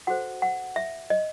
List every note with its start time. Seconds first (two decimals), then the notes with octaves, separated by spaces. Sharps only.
0.07 F#4 A4 C5 F#5
0.42 F#5
0.76 E5
1.10 D#5